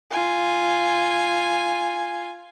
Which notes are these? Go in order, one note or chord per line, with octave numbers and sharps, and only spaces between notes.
F4 G#5